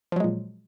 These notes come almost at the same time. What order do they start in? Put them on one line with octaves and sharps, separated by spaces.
F3 F#3 G#3 A#2